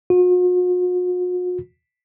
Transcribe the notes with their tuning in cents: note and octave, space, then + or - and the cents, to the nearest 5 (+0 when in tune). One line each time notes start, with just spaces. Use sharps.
F#4 -45